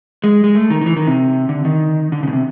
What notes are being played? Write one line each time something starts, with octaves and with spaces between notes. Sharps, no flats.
G#3
G#3
A3
D#3
D#3
E3
D#3
C3
D3
D#3
D3
C#3
B2
C3